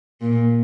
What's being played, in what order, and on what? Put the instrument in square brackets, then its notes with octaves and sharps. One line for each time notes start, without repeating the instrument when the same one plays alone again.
[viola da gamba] A#2